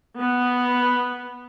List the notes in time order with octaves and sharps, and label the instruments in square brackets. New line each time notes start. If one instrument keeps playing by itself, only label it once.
[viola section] B3